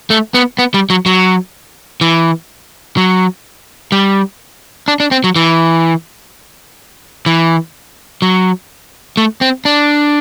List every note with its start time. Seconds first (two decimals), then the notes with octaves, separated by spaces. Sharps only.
0.10 A3
0.34 B3
0.59 B3
0.74 G3
0.90 F#3
1.06 F#3
2.01 E3
2.97 F#3
3.92 G3
4.88 D4
5.00 D4
5.11 C4
5.24 F#3
5.36 E3
7.26 E3
8.22 F#3
9.17 A3
9.41 C4
9.65 D4